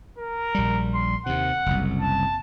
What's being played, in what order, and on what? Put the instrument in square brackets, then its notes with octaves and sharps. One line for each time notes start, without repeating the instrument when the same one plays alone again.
[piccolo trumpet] A#4
[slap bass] A#1 G3
[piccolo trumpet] C6
[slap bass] D#2 C3 [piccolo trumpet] F#5
[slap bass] F#1 C2
[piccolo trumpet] A5